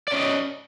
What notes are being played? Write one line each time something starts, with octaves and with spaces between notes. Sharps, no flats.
C#4 D5 D#5